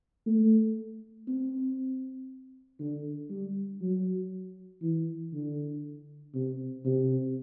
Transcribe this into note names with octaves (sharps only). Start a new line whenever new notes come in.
A3
C4
D3
G3
F#3
E3
D3
C3
C3